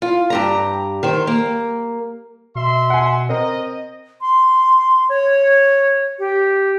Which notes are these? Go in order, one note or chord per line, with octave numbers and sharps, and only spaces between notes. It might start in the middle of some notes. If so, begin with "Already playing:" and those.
F4
G2 G4 A#5
D#3 C5
A#3
B2 E5 C6
F#5 G#5
C4 A#4 D#5
C6
C#5
G4